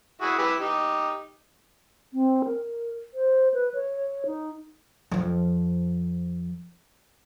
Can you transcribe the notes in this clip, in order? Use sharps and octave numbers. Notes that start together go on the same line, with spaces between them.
E4 F#4 G#4
E4 G4 B4
D#4 G4
C4
A#4
C5
B4
C#5
D#4
F2 F3